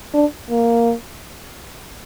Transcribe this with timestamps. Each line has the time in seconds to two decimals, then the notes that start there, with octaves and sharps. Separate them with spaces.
0.14 D4
0.50 A#3